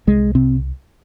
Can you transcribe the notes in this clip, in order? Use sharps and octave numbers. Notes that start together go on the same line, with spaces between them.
C2 G#3
C3 C4